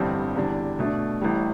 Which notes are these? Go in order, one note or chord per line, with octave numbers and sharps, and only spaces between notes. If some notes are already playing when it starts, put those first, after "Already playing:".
Already playing: A1 G2 D3 G3 C4
E2 D3 G3 D4
B2 A3 D4
A1 A2 G3